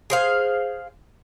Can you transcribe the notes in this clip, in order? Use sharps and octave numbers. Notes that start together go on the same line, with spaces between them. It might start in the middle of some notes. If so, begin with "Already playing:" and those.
G#4 C5 F5